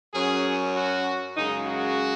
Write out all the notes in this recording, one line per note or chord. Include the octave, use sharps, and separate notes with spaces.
F#2 F#3 C#4 G#4
F#4
F#2 C#3 G#3 D#4
F#4